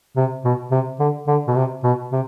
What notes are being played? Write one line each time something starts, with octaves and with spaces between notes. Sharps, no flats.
C3
B2
C3
D3
D3
B2
C3
B2
C3